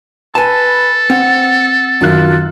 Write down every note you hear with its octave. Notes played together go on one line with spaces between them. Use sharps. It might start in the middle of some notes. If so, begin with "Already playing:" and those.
A4 B4 G#5 A5
C4 F#5
F#2 D#3 F4 F#6